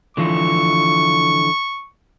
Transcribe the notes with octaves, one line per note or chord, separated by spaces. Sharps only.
D3 E3 F3 C#6